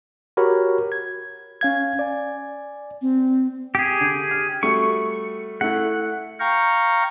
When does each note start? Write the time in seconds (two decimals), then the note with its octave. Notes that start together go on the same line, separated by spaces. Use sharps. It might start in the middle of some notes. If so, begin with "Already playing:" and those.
0.37 F#4 G4 A#4 C#5 B5
0.92 G#6
1.61 C#4 F5 G#6
1.99 D5 G#5
3.02 C4
3.75 G4 G#4
4.00 D3
4.31 F6
4.63 G3 A3 F#4 C#6
5.61 A3 E4 F#5
6.40 F5 G5 A#5 C#6